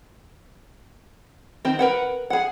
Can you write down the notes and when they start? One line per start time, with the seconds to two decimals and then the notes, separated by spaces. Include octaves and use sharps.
1.65 D#3 C4
1.79 A#4 B4 F#5
2.30 G#4 F#5